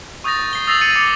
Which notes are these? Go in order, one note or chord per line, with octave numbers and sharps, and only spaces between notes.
C#6 D#6 G6 A6 A#6
C7 G7
D#6 E6 A6 A#6 C7 F7
A6 C#7 D#7 F7
D6 A6 C#7 F7